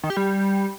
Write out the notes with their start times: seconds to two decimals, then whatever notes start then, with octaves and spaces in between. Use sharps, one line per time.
0.03 D#3
0.10 G4
0.17 G3